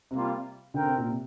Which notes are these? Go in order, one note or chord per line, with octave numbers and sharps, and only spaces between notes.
C3 G3 A#3 F4
D3 C4 A#4 G5
C3
A#2
C3